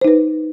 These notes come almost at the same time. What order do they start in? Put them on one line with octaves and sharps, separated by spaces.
C5 D#4 B4